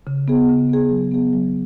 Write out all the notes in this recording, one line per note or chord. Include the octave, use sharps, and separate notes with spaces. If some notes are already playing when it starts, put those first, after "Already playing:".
C#3
B3 G#4
C#3
B3 G#4
F#3
B3 G#4
F#3